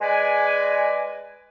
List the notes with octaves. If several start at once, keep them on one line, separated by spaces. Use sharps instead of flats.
G#3 B4 D5 G#5